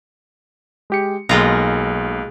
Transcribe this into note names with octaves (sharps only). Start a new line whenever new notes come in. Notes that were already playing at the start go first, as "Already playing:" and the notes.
G#3 G4 C#7
B1 G#3 A#3 F4 A#5